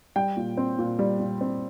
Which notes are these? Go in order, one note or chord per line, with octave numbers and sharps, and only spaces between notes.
G3 G5
A#2
C4
A#2
G3
A#2
C4